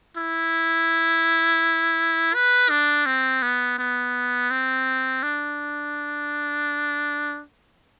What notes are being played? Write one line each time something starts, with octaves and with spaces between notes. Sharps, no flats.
E4
B4
D4
C4
B3
B3
C4
D4